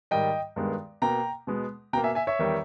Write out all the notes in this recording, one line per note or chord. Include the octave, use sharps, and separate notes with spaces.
G#2 D#3 G3 D#5 G5
G2 D#3 G#3 B3
B2 A#3 G5 A#5
B2 G#3 B3
B2 A#3 G5 A#5
E5 G#5
E5 G#5
C#5 E5
E2 D#3 G3